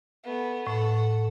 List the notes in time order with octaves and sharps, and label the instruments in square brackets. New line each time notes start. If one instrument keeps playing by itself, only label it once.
[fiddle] A3 B3
[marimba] A2 [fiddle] A4 F#5